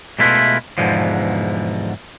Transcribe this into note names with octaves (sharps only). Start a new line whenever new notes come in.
B2 G#3 A3 E4 F4 B4
E2 G#2 B2 D3 F3